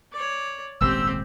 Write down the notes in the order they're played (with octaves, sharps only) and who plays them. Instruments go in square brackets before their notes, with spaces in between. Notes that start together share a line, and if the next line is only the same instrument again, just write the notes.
[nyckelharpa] C#5 D5
[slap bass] D#1 G#1 C#2 [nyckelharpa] C4 G4 [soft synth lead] E6